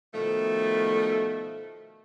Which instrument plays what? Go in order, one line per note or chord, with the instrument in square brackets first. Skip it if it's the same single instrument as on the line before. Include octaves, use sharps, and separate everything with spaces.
[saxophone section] B2 D#3 F3 A3